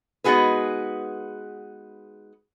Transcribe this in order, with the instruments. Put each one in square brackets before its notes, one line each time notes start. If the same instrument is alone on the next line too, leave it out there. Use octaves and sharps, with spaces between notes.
[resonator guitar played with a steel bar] G#3 B3 D#4 F#4 G#4 B4